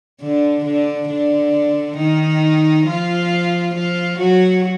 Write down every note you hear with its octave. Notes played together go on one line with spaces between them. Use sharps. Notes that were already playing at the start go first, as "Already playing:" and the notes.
D3 D4
D3 D4
D3 D4
D#3 D#4
F3 F4
F3 F4
F#3 F#4